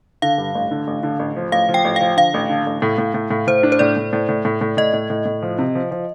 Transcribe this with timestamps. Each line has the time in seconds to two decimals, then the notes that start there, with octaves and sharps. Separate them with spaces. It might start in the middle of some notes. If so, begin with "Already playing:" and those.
0.22 D3 F5
0.38 G2
0.55 A1
0.71 D3
0.87 A1
1.03 D3
1.19 A1
1.36 F3
1.52 A1 F5
1.69 F3
1.74 G5
1.85 A1
1.96 F3 F5
2.17 D3 F5
2.34 A1
2.49 D3
2.67 A1
2.82 A2
2.98 A2
3.14 A2
3.31 A2
3.47 A2 C5
3.63 D4
3.72 C5
3.79 A2 D5
3.97 A2
4.13 A2
4.29 A2
4.45 A2
4.61 A2
4.77 A2 D#5
4.94 A2
5.10 A2
5.26 A2
5.42 F3
5.58 C3
5.75 F3
5.91 F3